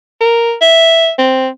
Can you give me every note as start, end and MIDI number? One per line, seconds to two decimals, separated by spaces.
0.21 0.53 70
0.61 1.10 76
1.19 1.48 60